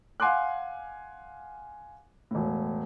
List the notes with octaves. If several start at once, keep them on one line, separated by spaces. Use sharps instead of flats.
F5 F#5 G#5 C6 D6 F#6
E1 A2